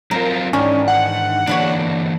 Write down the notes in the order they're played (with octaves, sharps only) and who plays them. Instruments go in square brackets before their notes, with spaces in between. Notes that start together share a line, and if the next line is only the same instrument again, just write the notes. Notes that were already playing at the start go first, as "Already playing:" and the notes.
[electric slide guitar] F#3 C4 F4 [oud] A#4
[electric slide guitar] G#2 [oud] D#3 E3 D4 [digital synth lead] C#4
[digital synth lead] F#5
[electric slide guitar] D3 E3 A#3 [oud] D4 B4 C#5